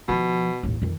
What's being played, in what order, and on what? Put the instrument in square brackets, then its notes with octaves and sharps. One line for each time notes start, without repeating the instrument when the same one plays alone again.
[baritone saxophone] B2 [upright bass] D#3 F3
[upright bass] A1 D#2
F2 D#3